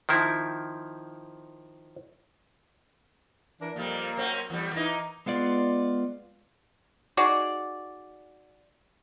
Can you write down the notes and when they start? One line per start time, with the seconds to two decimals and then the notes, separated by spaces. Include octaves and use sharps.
0.09 D#3 F3 C4 E4
3.60 E3 D4 A#4
3.76 F2 A#2 G3 A#3
4.17 F#3 C4 C#4
4.50 E2 G3
4.73 E3 A#3 D#4
5.26 G#3 B3 F4 D5
7.17 D#4 F#4 G#4 D5